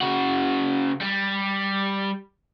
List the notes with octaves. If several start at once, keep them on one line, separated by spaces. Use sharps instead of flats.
C#3 F#4
G3